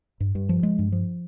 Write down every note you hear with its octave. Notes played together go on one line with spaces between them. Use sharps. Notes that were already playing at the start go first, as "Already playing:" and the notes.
G2
G2
F3
G#3
G2
F3